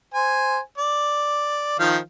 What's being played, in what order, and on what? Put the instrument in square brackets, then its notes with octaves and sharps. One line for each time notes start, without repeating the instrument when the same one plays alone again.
[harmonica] C5 G#5
D5
D#3 F3 F5